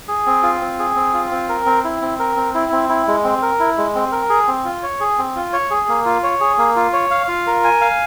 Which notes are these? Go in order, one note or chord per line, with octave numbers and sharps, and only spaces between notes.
G#4
C4
F4
C4
G#4
C4
F4
C4
A#4
C4
E4
C4
A#4
C4
E4
C4
E4
G#3
C4
A#4
E4
G#3
C4
A#4
G#4
C4
F4
C#5
G#4
C4
F4
C#5
G#4
A#3
F4
C#5
G#4
A#3
F4
C#5
F5
F4
A#4
G#5
F5